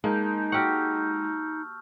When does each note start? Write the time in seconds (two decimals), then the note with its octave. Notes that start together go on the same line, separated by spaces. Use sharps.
0.04 G#3 A#3 D#4 A5 G6
0.52 F#4 G4 F#5 C#6 E6 F6